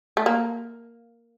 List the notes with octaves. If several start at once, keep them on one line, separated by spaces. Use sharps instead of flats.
A3
A#3